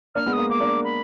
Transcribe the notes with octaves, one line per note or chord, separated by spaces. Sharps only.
A#3 D4 F6
G#3 B3
A#3 D#6
A#3 D6
A#3 D4
B5